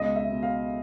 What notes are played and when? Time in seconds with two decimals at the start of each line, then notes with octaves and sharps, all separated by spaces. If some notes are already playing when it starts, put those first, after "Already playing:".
Already playing: C#2 B2 D#5
0.16 E5
0.30 B2
0.43 F5